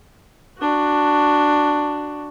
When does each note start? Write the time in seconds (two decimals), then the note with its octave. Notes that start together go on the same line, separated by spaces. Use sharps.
0.59 D4 F#4